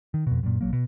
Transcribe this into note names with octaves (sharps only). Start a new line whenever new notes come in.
D#3
F2 B2
F#2 A#2
A#1 F#3 A#3
B2